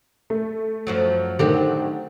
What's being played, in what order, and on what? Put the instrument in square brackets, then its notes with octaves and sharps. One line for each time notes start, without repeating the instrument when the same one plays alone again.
[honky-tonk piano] A3
[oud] F#2 F3 F#3
[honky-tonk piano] D3 D#3 A3 [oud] F#3 C4 G4